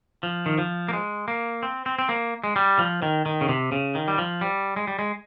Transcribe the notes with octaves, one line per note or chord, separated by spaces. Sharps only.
F3
D#3
F3
A#3
G#3
A#3
C4
C4
C4
A#3
G#3
G3
F3
D#3
D#3
C#3
C3
C#3
D#3
G3
F3
G3
G#3
G3
G#3